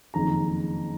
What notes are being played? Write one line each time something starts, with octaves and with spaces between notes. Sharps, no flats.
F#1 F2 D#3 G#3 A#5